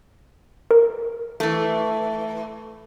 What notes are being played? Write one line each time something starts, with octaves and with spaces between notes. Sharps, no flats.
A#4
E3 A3